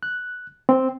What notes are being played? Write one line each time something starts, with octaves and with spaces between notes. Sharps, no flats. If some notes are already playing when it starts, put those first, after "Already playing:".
F#6
C4